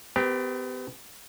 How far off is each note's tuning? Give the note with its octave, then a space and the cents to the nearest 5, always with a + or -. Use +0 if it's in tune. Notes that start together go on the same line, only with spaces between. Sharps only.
B3 +40 G4 +0 A#4 +45